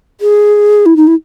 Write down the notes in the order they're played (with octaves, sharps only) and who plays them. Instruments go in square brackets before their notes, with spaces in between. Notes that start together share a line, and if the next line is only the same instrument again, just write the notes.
[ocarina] G#4
E4
D#4
E4